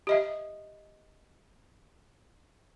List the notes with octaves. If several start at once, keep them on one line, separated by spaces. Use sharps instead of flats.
G4 D#5 E5